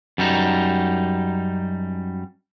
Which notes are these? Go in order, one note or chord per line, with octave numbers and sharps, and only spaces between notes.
F#2 G3 D#4